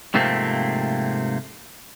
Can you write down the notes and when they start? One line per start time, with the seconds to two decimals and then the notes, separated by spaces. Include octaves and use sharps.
0.14 G#2 C3 F3 A3 A#3 C4